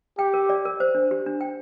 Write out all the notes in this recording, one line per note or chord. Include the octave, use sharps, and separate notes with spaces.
G4 G5
A#4
D5
A#4
C5
D4
G4
D4
G5